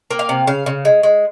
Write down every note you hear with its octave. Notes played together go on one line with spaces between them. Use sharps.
A#3
F5
C3
C#3 F5
C#3
G#3
G#3